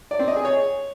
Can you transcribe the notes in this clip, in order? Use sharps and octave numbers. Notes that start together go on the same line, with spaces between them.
D5
C4
D#5
G#4
C#5